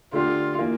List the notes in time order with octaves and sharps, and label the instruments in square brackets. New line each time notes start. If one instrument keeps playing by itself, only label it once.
[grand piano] D3 A3 D4 G4 [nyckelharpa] F4
[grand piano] E3 A#3 F4